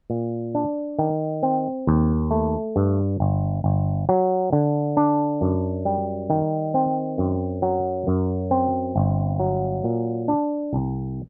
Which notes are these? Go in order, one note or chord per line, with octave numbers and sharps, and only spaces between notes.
A#2
D4
D#3
C4
D#2
A3
G2
G1
G1
F#3
D3
D4
F#2
G3
D#3
C4
F#2
F#3
F#2
C4
G1
F#3
A#2
D4
C2